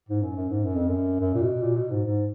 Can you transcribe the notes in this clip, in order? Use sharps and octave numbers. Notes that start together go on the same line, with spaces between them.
G#2
F#2
F#2
G#2
F#2
F2
F#2
F#2
A#2
B2
A#2
B2
G#2
G#2